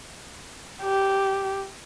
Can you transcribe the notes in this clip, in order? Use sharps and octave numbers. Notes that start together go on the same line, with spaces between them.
G4